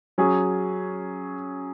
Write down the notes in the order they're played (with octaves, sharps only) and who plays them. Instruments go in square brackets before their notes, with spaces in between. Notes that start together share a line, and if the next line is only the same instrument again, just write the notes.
[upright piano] F#3 C#4 G#4